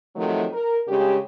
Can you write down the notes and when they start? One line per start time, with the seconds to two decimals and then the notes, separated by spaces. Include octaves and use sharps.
0.16 C3 D#3 F3 F#3 A3
0.52 A#4
0.88 G2 C#3 G#3 G4